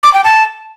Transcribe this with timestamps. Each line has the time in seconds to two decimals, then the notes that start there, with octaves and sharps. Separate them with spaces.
0.03 D6
0.14 G5
0.24 A5